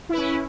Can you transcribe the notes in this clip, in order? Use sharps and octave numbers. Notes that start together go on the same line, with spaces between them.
C#4 E4 B4